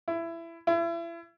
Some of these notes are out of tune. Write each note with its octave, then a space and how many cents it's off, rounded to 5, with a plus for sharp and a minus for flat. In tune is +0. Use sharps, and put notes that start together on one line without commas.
E4 +20
E4 +35